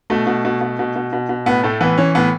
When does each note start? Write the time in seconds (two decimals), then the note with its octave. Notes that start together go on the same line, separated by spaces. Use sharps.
0.10 B2 A3
0.27 B2
0.45 B2
0.61 B2
0.79 B2
0.96 B2
1.13 B2
1.29 B2
1.46 A2 B3
1.63 A2 A3
1.81 E3 B3
1.98 E3 C#4
2.15 A2 B3